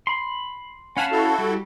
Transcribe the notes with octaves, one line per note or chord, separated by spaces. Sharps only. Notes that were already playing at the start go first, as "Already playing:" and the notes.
B5 C6
C#4 F5 F#5 G#5 A5 B5
E4 F#4 A4
G3